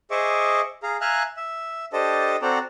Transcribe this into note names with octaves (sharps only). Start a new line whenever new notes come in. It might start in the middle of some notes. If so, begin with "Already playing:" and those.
G#4 C5 D#5 E5 C#6 D6
G#4 F5 A#5
E5 F5 G#5 A#5 F6 F#6
E5
D4 G4 A4 C5 D#5 A5
C4 F#4 A4 C5 D5 A#5